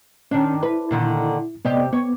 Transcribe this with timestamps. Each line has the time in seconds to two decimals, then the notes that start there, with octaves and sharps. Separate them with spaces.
0.31 D#3 C#4 D4
0.63 E4 B4
0.91 A#2 D3 D#3
1.65 C3 B3 G4 D5 D#5
1.93 B3 C#5